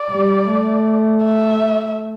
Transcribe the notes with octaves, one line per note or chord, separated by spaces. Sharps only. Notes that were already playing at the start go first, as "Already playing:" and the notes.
Already playing: D5
G3
A3
E5